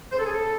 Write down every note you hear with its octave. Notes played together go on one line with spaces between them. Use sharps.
C#3 C5
A4
G#4
A4